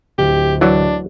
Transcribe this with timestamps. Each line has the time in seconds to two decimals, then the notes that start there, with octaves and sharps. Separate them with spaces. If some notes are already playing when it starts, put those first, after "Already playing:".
0.18 D1 G4
0.61 E3 F#3 D4